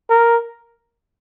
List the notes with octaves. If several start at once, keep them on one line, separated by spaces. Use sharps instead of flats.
A#4